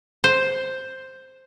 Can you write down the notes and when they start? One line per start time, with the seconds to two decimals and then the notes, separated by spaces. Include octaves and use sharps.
0.24 C5